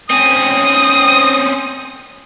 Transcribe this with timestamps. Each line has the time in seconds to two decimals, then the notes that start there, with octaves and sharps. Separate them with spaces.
0.10 C4 C#4 D#6